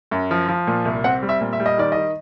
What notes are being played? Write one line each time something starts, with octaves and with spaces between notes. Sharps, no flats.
F#2
F3
F3
A#2
C2
C4 F#5
G3
E5
A#2
E5
G3
D#5
D#3 D5
D#3 D#5